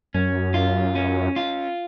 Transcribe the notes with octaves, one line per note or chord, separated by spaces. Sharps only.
F#2 C#4
F4
C#4
F4